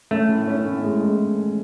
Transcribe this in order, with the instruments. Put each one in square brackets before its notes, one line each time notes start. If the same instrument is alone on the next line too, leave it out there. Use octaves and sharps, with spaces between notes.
[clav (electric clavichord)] A3 [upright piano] C#4
[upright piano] A2
C#4
A2
G#3